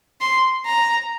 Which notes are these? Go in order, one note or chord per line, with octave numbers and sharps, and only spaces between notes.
C6
A#5